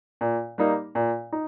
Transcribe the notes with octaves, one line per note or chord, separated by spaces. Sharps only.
A#2
G3 A#3 D#4
A#2
D#4